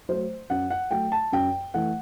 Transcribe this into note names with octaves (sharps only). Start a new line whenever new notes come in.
F#3 A3 C5
F#2 F#5
F#5
F#3 A3 G5
A5
F#2 G5
E3 A3 F#5